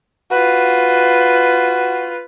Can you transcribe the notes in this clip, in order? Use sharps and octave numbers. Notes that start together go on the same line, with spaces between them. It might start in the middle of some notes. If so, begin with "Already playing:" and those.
F4 F#4 B4